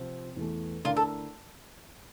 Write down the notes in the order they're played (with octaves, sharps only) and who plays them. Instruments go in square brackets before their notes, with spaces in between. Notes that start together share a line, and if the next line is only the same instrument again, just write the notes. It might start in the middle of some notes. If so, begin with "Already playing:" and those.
Already playing: [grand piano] C3 F3 C4 F4
E2 E3 A3
[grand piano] D3 A3 E4 A#4 D5 [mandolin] F4
[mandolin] A4